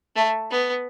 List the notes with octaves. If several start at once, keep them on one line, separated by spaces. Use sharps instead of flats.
A3
B3